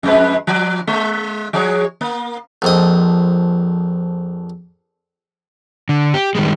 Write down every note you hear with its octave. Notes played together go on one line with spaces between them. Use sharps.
F2 G#3 B4
F3
G#3
F3 G#4 C#5
A#3
A#1 F2 D#5
D3
G4
D#3 G3 G#3